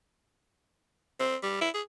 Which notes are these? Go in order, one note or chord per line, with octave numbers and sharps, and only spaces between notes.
C4
G3
E4
G#4